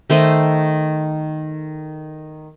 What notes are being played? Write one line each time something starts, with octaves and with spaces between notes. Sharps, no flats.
D#3 A3 C5 D#5